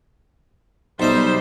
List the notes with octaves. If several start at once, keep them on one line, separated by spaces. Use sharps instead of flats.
B1 G3 D#4 C5 E5 A5